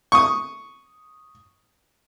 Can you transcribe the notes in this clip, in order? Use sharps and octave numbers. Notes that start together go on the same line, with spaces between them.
C#6 D#6